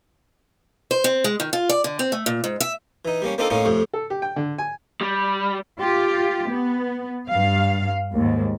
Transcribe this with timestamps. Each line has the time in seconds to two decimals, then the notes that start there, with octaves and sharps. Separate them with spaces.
0.91 C5
1.04 C4
1.24 G#3
1.40 D#3
1.53 F4
1.69 D5
1.84 D3
1.99 C4
2.12 A3
2.26 A#2
2.44 G#2
2.60 E5
3.05 E3 D#4
3.22 G3 A#3 C#4
3.38 A#3 C4 D4 D#4 F4 A4
3.50 A2 A#3 C#4 D#4 F4
3.65 F2 A2 C3
3.93 A4
4.10 G4
4.22 G5
4.36 D3
4.58 G#5
5.01 G3
5.79 F4 G4
6.49 B3
7.28 G2 F5
8.13 D#2 G#2